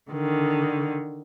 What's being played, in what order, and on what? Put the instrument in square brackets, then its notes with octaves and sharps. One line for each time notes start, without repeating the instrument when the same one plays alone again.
[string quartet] D3 D#3